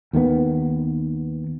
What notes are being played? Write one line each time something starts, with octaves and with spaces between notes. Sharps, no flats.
D#2 D#3 G#3 B3